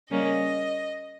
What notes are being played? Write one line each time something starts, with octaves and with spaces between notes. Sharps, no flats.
C#3 G3 A#3 C#4 D#5